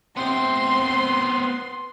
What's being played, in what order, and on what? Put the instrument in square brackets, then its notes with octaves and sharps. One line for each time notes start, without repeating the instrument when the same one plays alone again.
[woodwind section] C3 C4 [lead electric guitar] B3 C5 [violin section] C6